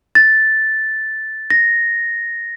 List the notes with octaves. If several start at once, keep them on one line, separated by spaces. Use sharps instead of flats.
A6
A#6